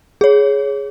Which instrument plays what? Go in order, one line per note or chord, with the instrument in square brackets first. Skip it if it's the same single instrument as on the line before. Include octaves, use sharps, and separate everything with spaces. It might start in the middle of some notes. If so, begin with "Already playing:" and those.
[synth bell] G#4 C#5